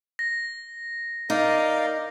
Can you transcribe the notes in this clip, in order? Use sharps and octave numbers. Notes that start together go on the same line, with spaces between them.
A#6
D#4 A#4 D5 F5